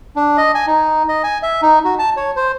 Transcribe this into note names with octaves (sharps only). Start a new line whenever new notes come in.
D4
D#5
G#5
D#4
D#5
G#5
E5
D#4
F#4
A5
C#5
C5